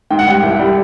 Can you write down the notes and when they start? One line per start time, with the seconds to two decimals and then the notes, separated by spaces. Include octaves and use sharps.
0.10 G#2 G5
0.19 F#5
0.27 G3 G5
0.43 C2
0.59 G3